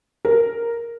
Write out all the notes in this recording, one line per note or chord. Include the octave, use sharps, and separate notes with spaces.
A#4